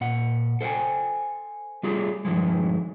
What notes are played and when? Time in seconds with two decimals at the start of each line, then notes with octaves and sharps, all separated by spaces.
0.01 A#2 F#5
0.61 A4 C5 E5 G5 G#5
1.83 G3 A3 F4 G4 G#4
2.25 G2 D#3 F3 G#3